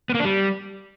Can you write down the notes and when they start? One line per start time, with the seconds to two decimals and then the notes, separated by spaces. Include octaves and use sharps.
0.10 B3
0.15 A#3
0.20 D4
0.25 G3